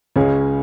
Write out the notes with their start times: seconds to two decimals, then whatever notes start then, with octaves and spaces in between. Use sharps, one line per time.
0.16 C#2 C#3 G#3 C#4 G#4